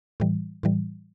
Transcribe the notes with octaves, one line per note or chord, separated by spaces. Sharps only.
A2 E3 G3
A2 E3 G3